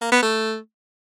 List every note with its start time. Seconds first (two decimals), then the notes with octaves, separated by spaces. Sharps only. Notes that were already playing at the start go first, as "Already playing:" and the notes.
0.01 A#3
0.12 B3
0.23 A3